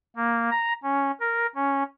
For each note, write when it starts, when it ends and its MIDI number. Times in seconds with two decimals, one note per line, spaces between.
0.16 0.50 58
0.51 0.73 82
0.83 1.11 61
1.20 1.47 70
1.55 1.83 61